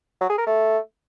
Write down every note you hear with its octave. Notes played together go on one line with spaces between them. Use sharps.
F#3
G#4
A#4
A3